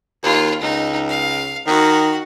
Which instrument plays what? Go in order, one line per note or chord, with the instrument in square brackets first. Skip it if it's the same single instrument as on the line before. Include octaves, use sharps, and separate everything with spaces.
[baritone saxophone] D#2 [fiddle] F4
[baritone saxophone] C#2 [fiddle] D#4
[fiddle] F5
[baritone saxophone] D#3 [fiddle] F#4